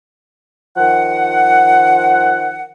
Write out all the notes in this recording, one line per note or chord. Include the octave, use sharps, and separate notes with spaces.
D#3 F3 F#5